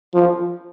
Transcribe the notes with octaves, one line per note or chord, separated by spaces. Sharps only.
F3